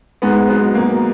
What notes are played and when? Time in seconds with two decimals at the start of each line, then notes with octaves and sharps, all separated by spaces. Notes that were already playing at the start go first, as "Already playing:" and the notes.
0.22 G#2 G#3 B3
0.49 F#3 G#3 B3
0.75 F#3 A#3